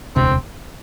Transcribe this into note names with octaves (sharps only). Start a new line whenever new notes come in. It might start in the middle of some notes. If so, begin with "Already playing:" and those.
E1 D2 C3 C4